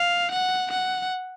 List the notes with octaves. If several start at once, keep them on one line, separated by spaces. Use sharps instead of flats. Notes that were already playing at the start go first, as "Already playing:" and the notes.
Already playing: F5
F#5
F#5